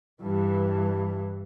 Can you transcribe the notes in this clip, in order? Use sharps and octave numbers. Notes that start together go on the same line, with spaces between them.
G2 E3